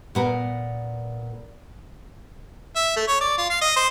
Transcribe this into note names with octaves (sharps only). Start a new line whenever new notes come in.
A#2 B3 A#4
E5
A3
C#5
D5
F4
F5
D#5
C5